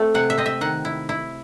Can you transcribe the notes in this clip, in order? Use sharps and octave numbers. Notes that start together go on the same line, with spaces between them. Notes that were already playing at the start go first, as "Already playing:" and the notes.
Already playing: A3 C4
C3 F#5
E5
C4 D#5
E5
D#3 F#5
E4
E4